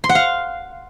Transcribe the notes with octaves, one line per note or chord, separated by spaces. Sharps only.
C6
F#5
F5